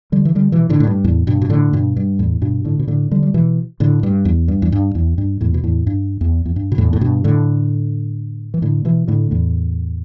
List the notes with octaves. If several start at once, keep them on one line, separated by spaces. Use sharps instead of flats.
D3 G3
E3
D3 G3
B2 E3
A2 D3
A2
G2
E2 A2
G2 B2
B2
A2 D3
G2 B2
G2
E2 A2
G2 B2
A2 D3
B2
A2 D3
D3 G3
G3
B2 E3
A2 D3
G2
E2
G2
E2
G2
E2
G2
E2 A2
B2
E2 A2
G2
E2
E2
G2
B2
E2 A2
A2
G2 B2
A2 D3
E3
A2 D3
B2 E3
A2 D3
E2 A2